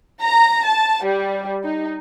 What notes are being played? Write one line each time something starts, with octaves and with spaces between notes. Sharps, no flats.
A#5
A5
G3
D#4